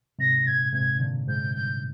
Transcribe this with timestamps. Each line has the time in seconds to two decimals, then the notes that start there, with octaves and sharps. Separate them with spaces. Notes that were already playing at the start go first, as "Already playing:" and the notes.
0.19 G#2 C3 A#6
0.46 A#2 G#6
0.73 G#2 C3 G#6
1.00 A#2 D3
1.27 G#2 G6
1.55 G2 G6